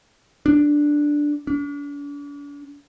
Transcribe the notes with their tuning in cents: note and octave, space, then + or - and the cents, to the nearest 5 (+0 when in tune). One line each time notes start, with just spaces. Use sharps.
D4 +0
D4 -40